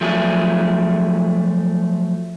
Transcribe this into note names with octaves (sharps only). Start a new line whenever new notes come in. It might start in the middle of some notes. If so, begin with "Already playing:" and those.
F3 F#3 A3 G#4